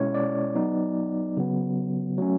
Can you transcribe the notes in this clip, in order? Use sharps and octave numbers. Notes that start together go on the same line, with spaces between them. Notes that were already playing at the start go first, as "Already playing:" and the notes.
Already playing: B2 G#3 C#4 E4 C#5
D5
F#3 B3 D#4
C#3 F#3 B3
F#3 A3 C#4